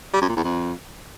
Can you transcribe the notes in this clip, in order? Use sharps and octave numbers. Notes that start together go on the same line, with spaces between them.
G3
F#2
A#2
E2
F2